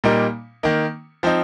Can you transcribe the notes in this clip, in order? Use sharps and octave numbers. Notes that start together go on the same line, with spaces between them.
A#2 G3 A#3 D#4
D#3 A#3 D#4
F3 C4 D#4